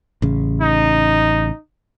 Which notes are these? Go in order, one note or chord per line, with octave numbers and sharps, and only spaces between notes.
A1 C#3
D#4